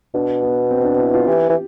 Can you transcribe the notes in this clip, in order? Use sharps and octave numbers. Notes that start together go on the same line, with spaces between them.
B2 D4
B3
C4
D4
E4
F4
E3 G4
E3